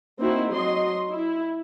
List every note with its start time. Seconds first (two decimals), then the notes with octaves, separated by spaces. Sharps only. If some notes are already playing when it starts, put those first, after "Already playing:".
0.20 A#3 C4 D#4 E4 F#4
0.52 F#3 D#5 C6
1.11 E4